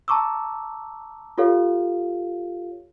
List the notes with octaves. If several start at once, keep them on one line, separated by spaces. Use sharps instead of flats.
A5 A#5 C#6 D6 E6
F4 G4 A4 C#5 F5